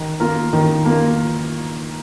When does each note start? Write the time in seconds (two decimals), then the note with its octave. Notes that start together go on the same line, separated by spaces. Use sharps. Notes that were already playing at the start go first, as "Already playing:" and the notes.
Already playing: D#3
0.20 A#3 F4 A#4
0.53 D#3
0.85 A#3 F4 A#4